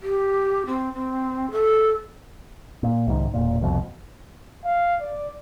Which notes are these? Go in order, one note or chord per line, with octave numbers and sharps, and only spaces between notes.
G4
C4
C4
A4
A#2
C2 G#2 D#3
E1 A#2
C2 F2 B2
F5
D5